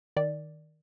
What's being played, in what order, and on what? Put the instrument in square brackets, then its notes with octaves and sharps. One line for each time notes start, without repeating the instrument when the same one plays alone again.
[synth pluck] D#3 D5